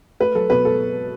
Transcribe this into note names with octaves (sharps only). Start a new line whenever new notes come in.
A3 B4
F#3 A4
B2 B4
A4